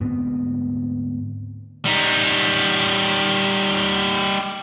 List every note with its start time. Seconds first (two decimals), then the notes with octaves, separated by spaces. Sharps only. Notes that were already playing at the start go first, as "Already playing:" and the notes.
0.01 D2 G#2 B3 C4
1.85 G3 D#4